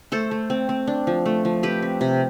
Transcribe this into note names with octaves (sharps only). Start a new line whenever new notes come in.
A3 A4 C5
A3
C4
C4
D4
F3
A3
F3
C4 G4 B4
C4
C3